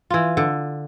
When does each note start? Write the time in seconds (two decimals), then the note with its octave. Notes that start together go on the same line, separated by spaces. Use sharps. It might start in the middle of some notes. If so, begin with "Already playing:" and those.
0.10 E3 F4
0.37 D3